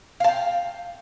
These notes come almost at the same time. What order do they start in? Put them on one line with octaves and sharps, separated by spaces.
F5 A5 G5